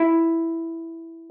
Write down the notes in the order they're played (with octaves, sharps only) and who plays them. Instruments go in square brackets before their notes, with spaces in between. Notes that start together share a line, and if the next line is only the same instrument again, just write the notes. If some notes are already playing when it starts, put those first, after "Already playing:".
Already playing: [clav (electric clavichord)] E4